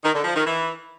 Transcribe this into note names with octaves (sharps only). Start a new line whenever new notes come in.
D#3
D3
F3
D#3
E3